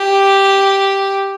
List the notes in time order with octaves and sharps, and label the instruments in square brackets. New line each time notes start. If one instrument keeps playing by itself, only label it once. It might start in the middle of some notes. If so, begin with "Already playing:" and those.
Already playing: [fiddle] G4